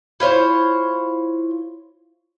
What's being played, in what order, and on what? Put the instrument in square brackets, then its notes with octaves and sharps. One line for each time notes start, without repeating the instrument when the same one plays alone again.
[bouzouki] E4 F4 C5 C#5